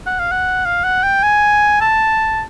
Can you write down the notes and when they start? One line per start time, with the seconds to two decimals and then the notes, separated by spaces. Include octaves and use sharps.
0.07 F#5
0.20 F5
0.31 F#5
0.66 F5
0.84 F#5
1.03 G5
1.23 G#5
1.81 A5